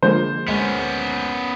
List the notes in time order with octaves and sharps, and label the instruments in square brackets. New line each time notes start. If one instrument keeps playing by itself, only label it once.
[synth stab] D3 F3 G#3 [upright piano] A#3 C5
[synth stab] D2 G#3 [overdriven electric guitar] B3 C#4